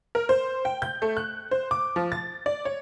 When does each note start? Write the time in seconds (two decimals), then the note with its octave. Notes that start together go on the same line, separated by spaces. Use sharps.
0.15 A#4
0.29 C5
0.65 G5
0.82 G6
1.02 A3
1.17 F#6
1.51 C5
1.71 D6
1.96 F3
2.12 A6
2.46 D5
2.65 C#5